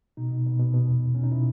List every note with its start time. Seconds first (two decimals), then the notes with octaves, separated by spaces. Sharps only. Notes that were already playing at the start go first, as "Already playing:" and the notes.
0.17 B2 D#4
0.31 B2
0.46 B2
0.59 B2
0.74 B2
0.88 E2
1.02 E2
1.15 B2 C#4
1.23 D#4
1.31 B2 E4